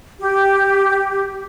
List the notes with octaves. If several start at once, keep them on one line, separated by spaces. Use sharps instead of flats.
G4